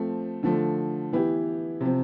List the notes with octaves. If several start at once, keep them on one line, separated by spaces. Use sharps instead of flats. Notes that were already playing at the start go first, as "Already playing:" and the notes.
Already playing: F3 A3 C4
D3 F3 A3
E3 B3 E4 G4
C3 F3 C4